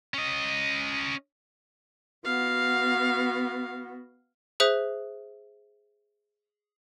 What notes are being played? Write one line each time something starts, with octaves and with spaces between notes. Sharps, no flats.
C#4 D#5
B3 F#4 F5
G#4 C5 E5 D#6 F#6